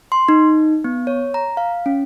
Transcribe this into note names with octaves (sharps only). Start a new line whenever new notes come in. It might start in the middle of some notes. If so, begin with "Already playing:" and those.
C6
D#4
B3
C#5
A#5
F5
C#4